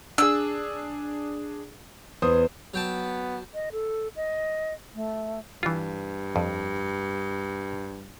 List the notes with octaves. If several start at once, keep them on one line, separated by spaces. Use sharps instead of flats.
D4 G#4 E6
E2 E3 C5 D#6
F#3 B3 G5 A5
D#5
A4
D#5
A3
G2 E3 F4
F2